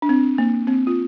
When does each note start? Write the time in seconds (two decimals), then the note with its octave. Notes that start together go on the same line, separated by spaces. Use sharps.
0.02 D4
0.09 C4
0.38 A#3
0.67 C4
0.87 F4